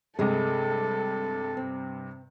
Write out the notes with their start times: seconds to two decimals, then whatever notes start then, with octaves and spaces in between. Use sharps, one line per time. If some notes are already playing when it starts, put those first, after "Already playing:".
0.19 G2 C3 G#3 G#4 A4
1.57 C4